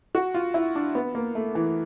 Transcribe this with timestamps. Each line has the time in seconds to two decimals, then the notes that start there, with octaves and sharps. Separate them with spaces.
0.15 F#4
0.34 F4
0.54 E4
0.75 D4
0.95 B3
1.15 A#3
1.35 A3
1.55 E3